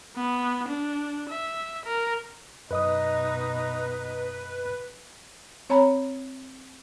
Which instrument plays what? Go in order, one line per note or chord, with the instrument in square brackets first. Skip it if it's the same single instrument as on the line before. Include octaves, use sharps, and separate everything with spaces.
[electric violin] B3
D4
E5
A#4
[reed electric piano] F#2 D#5 D#6 [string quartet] B2 D#4 [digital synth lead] B4
[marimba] C4 C#5 G#5 A#5 B5